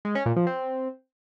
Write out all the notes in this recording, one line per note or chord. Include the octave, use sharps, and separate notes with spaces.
G#3
C#4
A#2
F3
C4